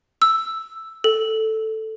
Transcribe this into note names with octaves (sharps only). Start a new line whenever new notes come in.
E6
A4